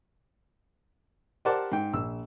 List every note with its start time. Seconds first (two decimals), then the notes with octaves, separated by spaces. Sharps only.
1.45 G4 A#4 C5 D5 F#5 A5
1.72 G#2 G5
1.93 A#1 E6